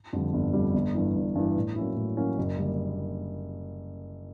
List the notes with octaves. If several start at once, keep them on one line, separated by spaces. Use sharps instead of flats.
F2 D3 G3
G1
F2 D3 G3
G1
G2 E3
G1
G2 E3
A2
F#3 A#3 C#4 E4
A2
F#3 A#3 C#4 E4
F#1
D3 G3 A#3